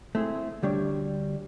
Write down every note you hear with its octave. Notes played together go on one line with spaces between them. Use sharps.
A3 C4 E4 G#4
D2 G3 D4 C#5